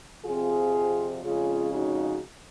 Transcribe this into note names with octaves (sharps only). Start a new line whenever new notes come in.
F2 C3 F3 C4 F4 G#4
F2 C#3 G#3 C#4 F4 G#4
D#4 F#4